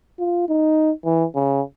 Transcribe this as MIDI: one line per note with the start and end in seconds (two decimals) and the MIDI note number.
0.19 0.44 65
0.49 0.91 63
1.05 1.25 52
1.35 1.62 49